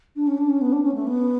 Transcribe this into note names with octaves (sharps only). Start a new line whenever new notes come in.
D4
C#4
D4
C#4
B3
D4
C#4
A3
B3